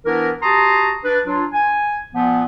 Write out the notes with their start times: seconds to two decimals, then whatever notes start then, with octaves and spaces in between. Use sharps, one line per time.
0.06 E3 B3 D4 E4 A#4
0.42 F#4 G4 A5 A#5 C6 D#6
1.05 D4 B4
1.27 F#3 D4 F4
1.53 G#5
2.15 A#2 F3 B3